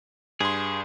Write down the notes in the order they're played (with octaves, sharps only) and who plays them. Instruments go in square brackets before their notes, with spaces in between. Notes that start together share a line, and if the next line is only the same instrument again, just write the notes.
[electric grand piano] G2 C6 [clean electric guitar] G#4